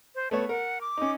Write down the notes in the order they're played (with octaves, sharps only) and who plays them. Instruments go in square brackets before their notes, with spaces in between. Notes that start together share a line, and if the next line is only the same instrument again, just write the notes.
[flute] C5
[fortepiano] A3 B3 C#5 [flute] A5
[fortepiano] A#4 [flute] F#5
[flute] D6
[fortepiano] C#4 D#4